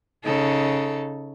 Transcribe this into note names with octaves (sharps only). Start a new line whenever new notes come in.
C#3 D#4 A4